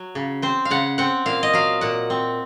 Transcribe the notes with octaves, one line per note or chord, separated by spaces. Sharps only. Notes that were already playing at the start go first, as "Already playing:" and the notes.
Already playing: F#3
C#3
C4 C5
F5
C#3 F#5
C4 F#5
A#2 F5
D#5
F#3 F5
A#2 F#5
C4